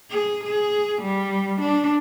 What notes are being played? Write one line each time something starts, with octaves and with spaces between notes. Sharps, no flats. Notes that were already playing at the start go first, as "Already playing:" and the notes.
G#4
G#4
G3
D4